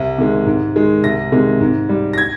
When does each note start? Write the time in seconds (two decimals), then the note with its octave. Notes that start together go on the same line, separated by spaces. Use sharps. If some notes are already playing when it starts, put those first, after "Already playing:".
Already playing: C2
0.18 C3 D#3 G#3
0.46 G#2
0.75 D#3 G#3
1.03 C2 A#6
1.32 C3 D#3 G#3
1.60 G#2
1.89 G3
2.13 A#6
2.18 G#6